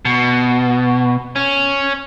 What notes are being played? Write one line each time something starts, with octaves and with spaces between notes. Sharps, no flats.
B2
C#4